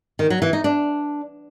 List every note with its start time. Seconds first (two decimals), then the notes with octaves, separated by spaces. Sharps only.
0.19 D#3
0.30 F#3
0.42 E3
0.53 D#4
0.64 D4